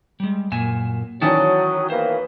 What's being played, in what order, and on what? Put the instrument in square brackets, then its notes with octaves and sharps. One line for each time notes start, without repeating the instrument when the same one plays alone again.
[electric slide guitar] G3 G#3
[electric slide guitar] F#2 A#2 G#5 [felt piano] E7
[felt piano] D#3 E3 C#4 [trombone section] F#3 [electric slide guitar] D5 F#5 A5 [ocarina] D#6
[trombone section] B2 A#3 E4 [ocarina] B4 [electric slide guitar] C5